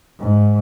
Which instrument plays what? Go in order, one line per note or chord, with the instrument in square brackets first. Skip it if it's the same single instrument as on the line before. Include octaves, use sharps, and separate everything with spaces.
[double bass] G#2